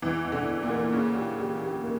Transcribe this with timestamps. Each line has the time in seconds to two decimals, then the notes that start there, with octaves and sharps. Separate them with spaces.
0.02 E2 E3
0.24 E2
0.32 D3
0.48 E2
0.62 A#2
0.70 A#3
0.92 C#3 C#4
1.15 G4
1.38 G4
1.62 G4
1.83 A#3